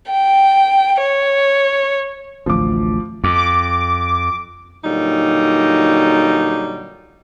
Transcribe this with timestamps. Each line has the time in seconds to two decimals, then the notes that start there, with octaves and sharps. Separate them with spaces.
0.10 G5
1.01 C#5
2.46 A1 D2 F3 D6
3.24 F2 D6
4.84 A#2 D3 F#3 G3 D#4